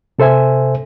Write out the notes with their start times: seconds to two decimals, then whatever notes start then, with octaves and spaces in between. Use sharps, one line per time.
0.19 C3 A4 C5 E5 G#5